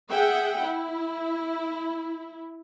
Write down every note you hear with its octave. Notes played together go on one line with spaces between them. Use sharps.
G#4 E5 F#5 G5
E4